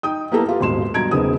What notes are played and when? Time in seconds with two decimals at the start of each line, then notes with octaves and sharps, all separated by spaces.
0.03 D#4 G5 D#6
0.32 A#3 B3 E4 G4 A4 A#5
0.47 B3 F4 G4
0.59 D#1 G#1 B2 C6 E7
0.94 G2 B2 A#5 G#6 D7
1.11 E1 C#3 B3 C4 D#4 D#6